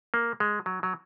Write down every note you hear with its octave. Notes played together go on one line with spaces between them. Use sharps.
A#3
G#3
F#3
F#3